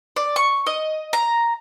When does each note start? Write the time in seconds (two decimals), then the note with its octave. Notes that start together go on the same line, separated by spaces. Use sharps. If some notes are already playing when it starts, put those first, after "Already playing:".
0.16 D5
0.36 C#6
0.66 D#5
1.13 A#5